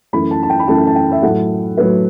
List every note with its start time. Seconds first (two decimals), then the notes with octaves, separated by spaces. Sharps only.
0.13 F#2 E3 A3 B5
0.31 A5
0.43 A5
0.50 G5
0.59 B5
0.68 F#2 E3 A3 A5
0.87 A5
0.96 G5
1.12 E5
1.22 A2 F#3 A3 F#5
1.77 A2 F#3 A3 B4